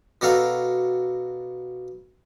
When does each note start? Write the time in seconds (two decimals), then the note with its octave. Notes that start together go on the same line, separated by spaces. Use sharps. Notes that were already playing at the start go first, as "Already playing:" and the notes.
0.21 B2 D4 F#4 A4 F5 A#5